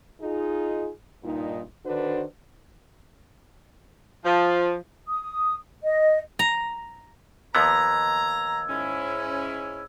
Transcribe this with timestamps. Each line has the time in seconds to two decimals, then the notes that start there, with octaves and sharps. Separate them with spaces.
0.21 D#4 F4 G#4
1.24 G2 A#2 D#4
1.85 D3 D#3 D4 F#4 B4 C5
4.25 F3
5.08 D#6
5.83 D#5
6.39 A#5
7.55 D#2 F3 B3 A#5 E6 G#6
8.69 G#2 C#4 E4